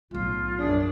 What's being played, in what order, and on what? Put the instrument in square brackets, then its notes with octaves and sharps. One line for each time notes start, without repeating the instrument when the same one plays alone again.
[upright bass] B1 A2 [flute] F4
[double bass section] F#2 [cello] D4 [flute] G#4